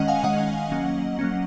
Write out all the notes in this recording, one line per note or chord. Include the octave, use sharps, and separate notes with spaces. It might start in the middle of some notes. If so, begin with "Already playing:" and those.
Already playing: D#3 G#3 C#4 D#5 F#5
F5 G#5
D#3 G#3 C#4 D#5 F#5
F#3 A#3 C#4
F#3 A#3 C#4